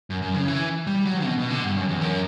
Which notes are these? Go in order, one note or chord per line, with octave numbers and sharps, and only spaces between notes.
F#2
F#2
C#3
E3
G3
F#3
B2
B2
D3
G2
F#2
E2
F#2